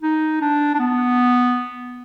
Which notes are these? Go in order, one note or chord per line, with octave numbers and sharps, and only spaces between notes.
D#4
D4
D4
B3